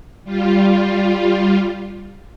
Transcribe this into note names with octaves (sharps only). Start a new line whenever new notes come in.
G3 F4